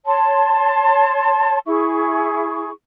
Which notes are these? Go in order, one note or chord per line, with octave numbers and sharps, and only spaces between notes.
C#5 A5 C6
E4 G#4 C#6